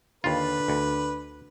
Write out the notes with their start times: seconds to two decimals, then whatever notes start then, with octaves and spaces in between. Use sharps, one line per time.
0.24 D#2 D3 F4 B4
0.68 D2